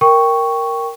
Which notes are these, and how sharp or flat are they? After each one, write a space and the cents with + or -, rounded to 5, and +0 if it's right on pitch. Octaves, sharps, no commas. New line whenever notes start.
A#4 +0 G5 +0 C#6 +0